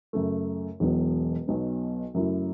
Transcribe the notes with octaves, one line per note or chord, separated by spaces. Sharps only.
F#2 C#3 A3
E1 E2 B2 F#3 B3
B1 B2 F#3 B3
F#2 C#3 F#3 A3 E4